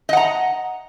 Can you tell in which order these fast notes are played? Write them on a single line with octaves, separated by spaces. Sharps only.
D#5 F#5 A#5